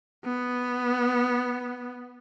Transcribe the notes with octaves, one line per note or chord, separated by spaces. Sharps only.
B3